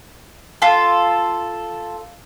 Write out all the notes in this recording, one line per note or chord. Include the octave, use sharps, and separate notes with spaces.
F4 A4